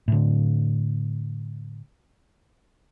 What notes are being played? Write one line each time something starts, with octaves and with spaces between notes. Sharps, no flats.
A2 D3